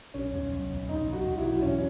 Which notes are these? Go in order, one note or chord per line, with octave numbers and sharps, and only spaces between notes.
B1 C#4
B1
B1
B1
B1 D#4
B1
F#4
B1
E4
B1
E1 C#4